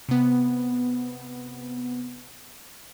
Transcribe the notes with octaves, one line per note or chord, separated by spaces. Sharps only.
C3 B3